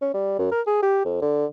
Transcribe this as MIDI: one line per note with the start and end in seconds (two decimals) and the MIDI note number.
0.02 0.10 61
0.14 0.39 55
0.39 0.47 42
0.52 0.61 70
0.67 0.81 68
0.83 1.01 67
1.05 1.18 41
1.22 1.45 50